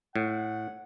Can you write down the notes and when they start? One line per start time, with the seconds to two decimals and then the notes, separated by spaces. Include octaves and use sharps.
0.16 A2 F#5